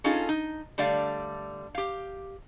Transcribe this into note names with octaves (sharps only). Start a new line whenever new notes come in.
C#4 D#4 F4 G#4 A4
D#4
D3 G3 A3 D5 F5
G4 F5